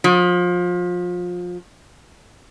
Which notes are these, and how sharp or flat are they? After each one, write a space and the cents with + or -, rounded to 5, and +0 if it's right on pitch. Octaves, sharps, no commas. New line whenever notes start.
F3 +25